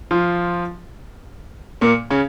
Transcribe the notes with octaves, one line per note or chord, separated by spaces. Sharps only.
F3 F4
A#2 A#3
C#3 C#4